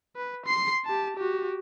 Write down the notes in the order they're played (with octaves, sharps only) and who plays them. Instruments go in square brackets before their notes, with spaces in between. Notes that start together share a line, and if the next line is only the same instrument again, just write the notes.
[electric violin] B4
C6 C7
G4 A5
F#4 G4